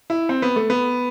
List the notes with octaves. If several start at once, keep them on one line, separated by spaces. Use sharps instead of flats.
E4
C4
B3
A3
B3